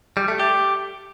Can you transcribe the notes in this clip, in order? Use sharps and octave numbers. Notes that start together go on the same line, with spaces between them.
G3
A3
G4